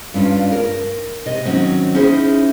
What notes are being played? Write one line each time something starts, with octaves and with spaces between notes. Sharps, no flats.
G2 C#4 D4 F4
A#4
C3 D#5
D#3 E3 F#3 C4 C#4
C#4 D#4 E4 G#4 C5